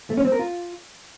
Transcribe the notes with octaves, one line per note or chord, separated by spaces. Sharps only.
A3
C#4
C4
A#4
F4